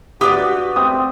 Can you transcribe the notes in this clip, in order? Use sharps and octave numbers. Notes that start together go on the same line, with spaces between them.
F#4 G4 B4 D5 D#6
C4 D#6